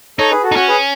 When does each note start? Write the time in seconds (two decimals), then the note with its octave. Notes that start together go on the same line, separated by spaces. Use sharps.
0.19 D#4 A4 C#5
0.31 G#4 B4
0.43 F#4 A4
0.52 D#4
0.56 C#4 F#4
0.68 G#4 B4